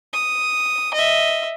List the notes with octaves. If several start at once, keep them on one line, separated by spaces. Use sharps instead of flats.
D#6
D#5 E5